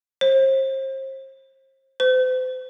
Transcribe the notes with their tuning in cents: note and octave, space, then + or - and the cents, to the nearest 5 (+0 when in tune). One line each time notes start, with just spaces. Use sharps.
C5 +35
C5 -40